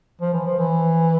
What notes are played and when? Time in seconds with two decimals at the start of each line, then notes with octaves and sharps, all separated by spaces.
0.21 F3
0.33 E3
0.46 F3
0.59 E3